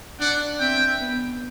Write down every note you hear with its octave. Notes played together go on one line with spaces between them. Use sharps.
D4 D5 F#5
C4 E5 G5
B3